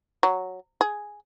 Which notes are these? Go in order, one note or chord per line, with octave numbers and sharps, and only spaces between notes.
F#3
G#4